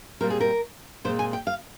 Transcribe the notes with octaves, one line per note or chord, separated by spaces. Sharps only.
A#2 G3 C4 A#4
G#4
A#4
A#2 G#3 C4 C5
G#5
G5
F5